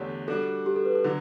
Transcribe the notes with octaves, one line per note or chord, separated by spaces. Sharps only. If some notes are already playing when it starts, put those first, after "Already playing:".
Already playing: E2 D3 A3 D4 G4 C#5
G3 D4 F#4 A4
G4
A4
B4
A4
D3 F#3